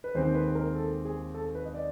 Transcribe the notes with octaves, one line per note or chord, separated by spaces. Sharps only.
B4
D#2 D#3 G#3 C4 C5
B4
A#4
A4
G#4
A4
B4
D#5
D5